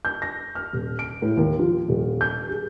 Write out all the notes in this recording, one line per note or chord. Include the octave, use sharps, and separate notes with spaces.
G6
A#6
F6
D#1
D7
A2
D#2
F3
D#1
G6
G#4